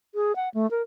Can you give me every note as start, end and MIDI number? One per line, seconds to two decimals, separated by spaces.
0.15 0.35 68
0.36 0.49 78
0.54 0.69 57
0.71 0.82 70